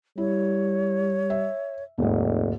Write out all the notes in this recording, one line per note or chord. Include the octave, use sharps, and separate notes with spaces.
G3 E4 C#5
E5
F1 D#2 G#2